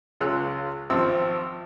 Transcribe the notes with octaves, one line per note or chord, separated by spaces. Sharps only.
C#2 G#3 F4 C#5 E6 F#6
G#1 F3 C4 E6